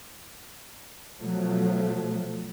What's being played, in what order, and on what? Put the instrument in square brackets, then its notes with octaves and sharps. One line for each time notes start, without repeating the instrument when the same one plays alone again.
[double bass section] B2 F3 F#3 A3